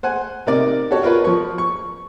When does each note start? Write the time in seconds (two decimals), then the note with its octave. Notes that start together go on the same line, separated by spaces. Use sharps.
0.03 C5 F#5 G#5
0.47 C3 D#4 A#4 D5 D6
0.91 F#4 G4 A4 C#5
1.03 F4 A#4 B4 C#5
1.24 F3 C#6
1.58 C#6